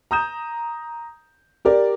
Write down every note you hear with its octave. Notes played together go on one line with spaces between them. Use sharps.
A#5 D#6 G6 E7
G4 A#4 D5